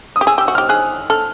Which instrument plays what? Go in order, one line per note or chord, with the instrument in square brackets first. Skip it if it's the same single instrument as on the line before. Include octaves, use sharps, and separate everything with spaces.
[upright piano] D#6
[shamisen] G4
[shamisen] G#4 [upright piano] E6
[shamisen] G4 [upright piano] E6
[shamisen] F#4
[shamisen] G4 [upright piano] F6
[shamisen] G#4 [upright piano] F#6
[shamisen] A4 [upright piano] F6